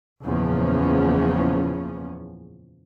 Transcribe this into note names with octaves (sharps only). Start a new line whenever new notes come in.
F#1 E2 A#2 C#3 F3 C#4